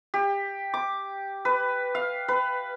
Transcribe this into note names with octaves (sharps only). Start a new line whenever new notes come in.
G4
D6
B4
F5
B4